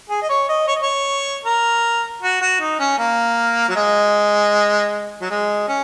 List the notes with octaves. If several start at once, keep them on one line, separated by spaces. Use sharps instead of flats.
G#4
D#5
C#5
D#5
C#5
D#5
C#5
A#4
F#4
F#4
D#4
C#4
A#3
F#3
G#3
F#3
G#3
C#4